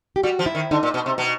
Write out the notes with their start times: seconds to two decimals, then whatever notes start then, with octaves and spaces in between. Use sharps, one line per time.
0.16 G4
0.23 G3 F#4
0.39 F3
0.46 E4
0.55 D#3
0.71 D3 D#4
0.83 A#2
0.94 B2
1.06 C3
1.18 B2